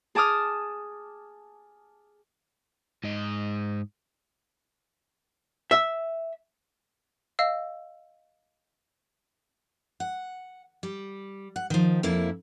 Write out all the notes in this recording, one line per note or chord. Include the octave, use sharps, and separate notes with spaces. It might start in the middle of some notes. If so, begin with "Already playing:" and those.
G#4 A5 D6 D#6 F6
G#2 D#5
E5
D#5 F5 E6
F#5
G3
F#5
D#3 F3
F2 A#3 E4 E5